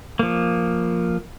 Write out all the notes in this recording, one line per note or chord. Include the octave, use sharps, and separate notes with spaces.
F3 A#3